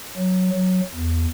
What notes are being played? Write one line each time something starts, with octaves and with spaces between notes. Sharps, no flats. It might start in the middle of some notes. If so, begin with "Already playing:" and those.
F#3
F#3
E2